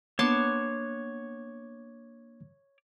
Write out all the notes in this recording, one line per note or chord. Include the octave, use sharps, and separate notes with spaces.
A#3 B3 D4 C#5 A5 C6 D6